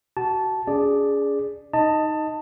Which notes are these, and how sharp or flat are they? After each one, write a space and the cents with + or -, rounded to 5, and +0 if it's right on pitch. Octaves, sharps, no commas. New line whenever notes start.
F#4 +30 A5 -10
C#4 +40 G#4 +0 D5 +0
D#4 +0 D#5 +0 A5 +20